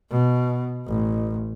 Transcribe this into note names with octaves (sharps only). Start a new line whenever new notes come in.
B2
A1